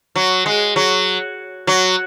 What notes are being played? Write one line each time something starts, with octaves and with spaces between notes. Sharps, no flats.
F#3
G#3
F#3
F#3